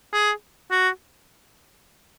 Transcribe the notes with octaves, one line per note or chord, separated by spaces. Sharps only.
G#4
F#4